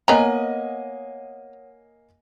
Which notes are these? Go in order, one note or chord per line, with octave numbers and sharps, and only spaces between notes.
A#3 B3 C#5 D#5 F#5 G#5 A#5